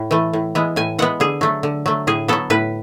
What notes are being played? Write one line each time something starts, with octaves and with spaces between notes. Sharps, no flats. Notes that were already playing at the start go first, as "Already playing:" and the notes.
Already playing: A2
E3 A3
A2
E3 G#3 B3
A2 G#5
E3 G#3 B3 F#5
D3 G#4
F#3 A3
D3
F#3 A3
A2 G#4
F#3 B3 A4
A2 B4